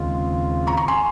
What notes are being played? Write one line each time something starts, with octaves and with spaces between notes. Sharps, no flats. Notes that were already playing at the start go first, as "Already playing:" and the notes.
Already playing: D#2 C#3 G#3 C4 F4
A#5 C#6
A#5 C#6
G#5 C6